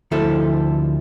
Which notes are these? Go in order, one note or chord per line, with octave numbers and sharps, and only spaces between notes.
D2 F3 E4 A4